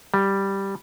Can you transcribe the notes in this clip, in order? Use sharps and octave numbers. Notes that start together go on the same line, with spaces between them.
G3